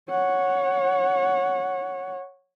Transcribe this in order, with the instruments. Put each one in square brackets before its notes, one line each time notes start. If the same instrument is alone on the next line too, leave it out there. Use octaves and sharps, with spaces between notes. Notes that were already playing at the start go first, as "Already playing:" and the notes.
[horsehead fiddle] C#5 F#5